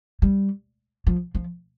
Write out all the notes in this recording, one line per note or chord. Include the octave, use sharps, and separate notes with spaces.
G3
F3
F3